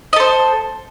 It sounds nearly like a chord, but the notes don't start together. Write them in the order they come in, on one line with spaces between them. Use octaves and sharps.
D#5 A4 C5